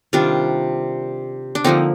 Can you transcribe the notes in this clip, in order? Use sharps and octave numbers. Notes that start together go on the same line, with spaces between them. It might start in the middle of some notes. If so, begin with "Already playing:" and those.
C3 D#3 G3 D4 F4
D4
D3 F3 A#3 C4 D#4